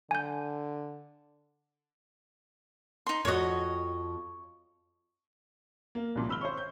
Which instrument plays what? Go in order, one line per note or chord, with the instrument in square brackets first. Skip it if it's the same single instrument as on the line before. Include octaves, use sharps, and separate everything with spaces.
[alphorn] D3 [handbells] G#5 G6
[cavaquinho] D#4 C6
[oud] F2 F#4 [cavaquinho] C#5 D#5
[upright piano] A#3
C2 A#2 F3
G#1 B5 E6 F6 G7
C5 C#5 C#6
G6